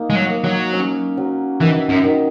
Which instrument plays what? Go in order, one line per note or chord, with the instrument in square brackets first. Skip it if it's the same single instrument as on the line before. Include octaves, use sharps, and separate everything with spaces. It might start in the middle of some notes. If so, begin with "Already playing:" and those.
Already playing: [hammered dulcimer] A#3 D#4
[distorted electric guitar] G#3
F#3
[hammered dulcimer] A#3
[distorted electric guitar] F#3
[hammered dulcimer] C#4
F#3
[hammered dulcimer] D#3 [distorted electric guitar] E3
[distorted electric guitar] F#2
[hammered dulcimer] D#3